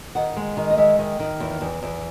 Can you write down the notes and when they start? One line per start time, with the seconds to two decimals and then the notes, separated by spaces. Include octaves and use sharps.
0.15 D#3 F#5
0.37 G#3
0.57 D#3
0.70 D#5
0.77 G#3 E5
0.99 D#3
1.19 D#3
1.40 E2
1.61 E2
1.83 E2